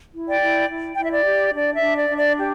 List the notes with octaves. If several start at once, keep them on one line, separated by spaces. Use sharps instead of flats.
E4
D5 G5
E4
E4
E4 G5
E5
D5
G4
D4 D5
E5
D4
D5
D4
D5
G4